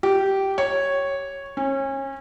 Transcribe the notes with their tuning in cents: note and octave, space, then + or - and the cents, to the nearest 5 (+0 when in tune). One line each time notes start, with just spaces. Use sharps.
G4 -15
C#5 -5
C#4 -30